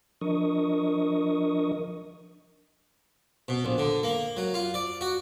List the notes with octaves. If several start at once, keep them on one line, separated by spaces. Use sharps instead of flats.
F3 D4 A#4 D#5 C#6 D#6
B2
A#1
D3
A#3
F#3
F4
D5
F#4